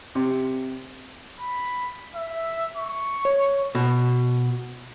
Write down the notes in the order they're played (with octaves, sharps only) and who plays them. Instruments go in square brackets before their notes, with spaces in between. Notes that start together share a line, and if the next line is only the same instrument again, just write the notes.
[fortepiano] C3
[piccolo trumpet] B5
E5
C#6
[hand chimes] C#5
[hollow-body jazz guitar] B2